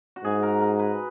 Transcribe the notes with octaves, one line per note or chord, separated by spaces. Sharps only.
F#4
G#2 G#4
A#4
A#4
B4